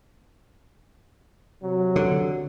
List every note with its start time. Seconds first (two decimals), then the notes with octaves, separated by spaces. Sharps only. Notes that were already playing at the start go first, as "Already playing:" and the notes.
1.63 C3 F#3
1.96 D3